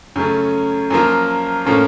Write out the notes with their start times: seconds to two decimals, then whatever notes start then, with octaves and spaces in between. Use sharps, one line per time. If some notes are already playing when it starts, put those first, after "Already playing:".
0.16 F#2 C#3 A3 C#4
0.90 F#2 F3 A#3 F4
1.65 A2 F3 A#3 C#4 F4